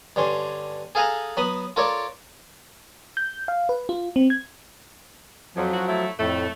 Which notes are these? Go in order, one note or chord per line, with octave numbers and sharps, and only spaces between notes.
G2 D3 C#4 C6
G#4 A4 F5 F#5 G#5 A#5
F#3 B3 B5 D#6
F4 A4 A#4 C#5 D5 C#6
G6
F5
B4
F4
C4
G#6
F2 F3 F#3
F#2 A2 F#4
A3 E4
F2 A2 A3